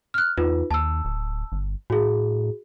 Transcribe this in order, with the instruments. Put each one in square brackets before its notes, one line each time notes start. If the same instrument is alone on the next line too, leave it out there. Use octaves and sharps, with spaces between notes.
[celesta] F6 F#6
[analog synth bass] E2 [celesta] D#4 F4 B4
[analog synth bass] D#2 [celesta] A5 E6
[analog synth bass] D1
G1
[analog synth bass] A2 [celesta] F#4 G#4